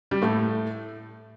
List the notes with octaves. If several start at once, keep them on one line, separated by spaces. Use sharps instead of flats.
G3
A2 A3